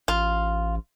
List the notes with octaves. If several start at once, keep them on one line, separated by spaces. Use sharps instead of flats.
A1 F4